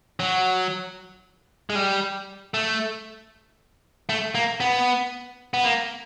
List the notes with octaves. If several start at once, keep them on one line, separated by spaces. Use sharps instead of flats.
F#3
G#3
G3
A3
A3
A#3
B3
B3
A#3